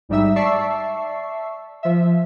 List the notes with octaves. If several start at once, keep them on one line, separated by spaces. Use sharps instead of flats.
A1 G#2 G3 D#4 E5 E6
D5 E5 A5 C#6 E6 C7
F3 E5